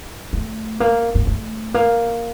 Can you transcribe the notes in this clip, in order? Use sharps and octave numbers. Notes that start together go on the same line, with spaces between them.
A3
A#3
A#3
A3
A#3